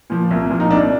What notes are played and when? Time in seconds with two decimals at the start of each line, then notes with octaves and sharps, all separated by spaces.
0.10 A#2 F3
0.31 C2
0.50 A#2 F3
0.60 D#4
0.70 C2 D4